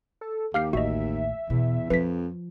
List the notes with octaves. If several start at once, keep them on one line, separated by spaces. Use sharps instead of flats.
A4
D#2 G4 F5 F6 C7
A1 F#4 D#5 E5
E2 B2
F2 F3 B4 B6